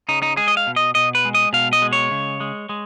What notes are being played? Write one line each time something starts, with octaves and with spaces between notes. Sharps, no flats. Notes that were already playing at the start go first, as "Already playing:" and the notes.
C#3 D#4
D#4
G#3 G#4
D#5
F5
B2
D#5
B2 D#5
B4
G#3
D#5
B2 F5
D#5
G#3
C#5
C#3
G#3
G#3